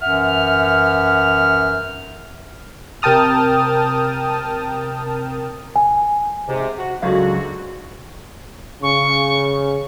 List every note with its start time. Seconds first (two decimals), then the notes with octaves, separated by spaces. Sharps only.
0.02 F#2 E3 E5 F#5 F6
3.02 C3 A#4 G5 A5 D#6 F6
5.76 G#5
6.48 G#2 C3
6.78 F#4
7.02 C#2 G#2 D3 F#3 F#4 F5
8.83 C#3 C#6